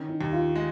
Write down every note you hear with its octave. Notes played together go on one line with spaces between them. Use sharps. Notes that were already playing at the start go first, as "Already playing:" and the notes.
Already playing: D#3 C#4
D#4
D#2
F4
G#3